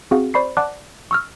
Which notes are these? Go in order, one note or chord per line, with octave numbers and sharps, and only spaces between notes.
C4 F#4 G#4 F5 F#5
C5 D5 B5 C#6 C7
D5 F#5 A5 D6 F#6
C#6 E6 F6